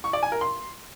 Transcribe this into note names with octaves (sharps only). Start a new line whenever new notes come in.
C#6
D5
G#5
A#4
C6